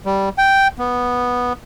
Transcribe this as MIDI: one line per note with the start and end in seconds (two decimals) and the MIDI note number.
0.06 0.29 55
0.38 0.68 79
0.79 1.53 59